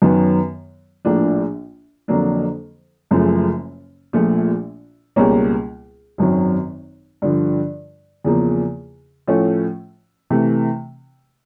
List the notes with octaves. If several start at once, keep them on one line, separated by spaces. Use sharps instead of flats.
F#2 D#3 F#3 B3
A#1 A2 F3 A#3 D4
F2 D3 F#3 A#3 D4
F#1 F#2 C#3 F3 A3
A#1 A#2 F3 A3
C#2 B2 G3 A#3 C#4
G#1 F#2 D#3 F#3
G2 D3 F3
E2 C#3 F3 A#3
A2 F3 A3 C#4 F4
C3 E3 A3